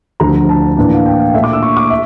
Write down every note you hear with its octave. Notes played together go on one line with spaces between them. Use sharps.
D2 D3 F3 A#5
A5
A2 E3 A#3 D4
F5
G5
F5
A#2 A3 D4 E5
D6
E6
C#6
D6
E5